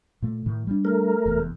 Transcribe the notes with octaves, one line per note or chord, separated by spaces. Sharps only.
A#2 A3
A2 D#3
G3 G#3 D4
A3 A#4
F1 E2